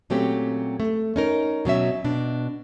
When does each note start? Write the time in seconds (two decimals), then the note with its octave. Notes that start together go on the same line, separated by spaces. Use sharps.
0.10 A#2 F#3 A3 C4 C#4 G4
0.80 A3
1.16 C#4 D#4 A#4
1.65 B2 F#3 C#4 E5
2.04 B2 D4